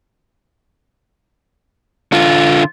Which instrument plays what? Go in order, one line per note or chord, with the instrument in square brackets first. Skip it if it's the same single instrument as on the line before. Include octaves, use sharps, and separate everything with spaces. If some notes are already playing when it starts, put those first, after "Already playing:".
[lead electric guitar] D3 F4